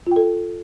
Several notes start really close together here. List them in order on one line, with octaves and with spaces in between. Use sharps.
F4 G5 A4